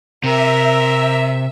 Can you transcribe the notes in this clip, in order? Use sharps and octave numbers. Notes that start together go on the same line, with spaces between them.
C3 A#4 E5